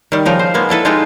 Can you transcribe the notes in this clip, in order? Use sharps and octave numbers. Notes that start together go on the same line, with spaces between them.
D#3 G3
C#3 F3 D#4 A#4
C5
G#3 A#3 B3
D4 E4 A4 B4
G#3 D#4 F4 G4 A4 C5